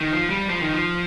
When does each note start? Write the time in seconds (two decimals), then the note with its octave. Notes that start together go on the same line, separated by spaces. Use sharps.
0.01 D#3
0.12 F3
0.30 G3
0.50 F3
0.61 D#3
0.73 F3